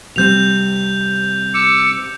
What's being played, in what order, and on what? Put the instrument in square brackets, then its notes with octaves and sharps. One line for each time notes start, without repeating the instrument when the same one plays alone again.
[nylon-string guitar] C3 G3 C4 [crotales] G6 F7
[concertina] D6 E6 [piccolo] C#7